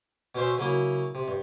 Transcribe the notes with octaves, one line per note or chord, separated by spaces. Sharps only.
B2 C#4 C5 E5
C#3 F#3 A#3 E4
C3
G2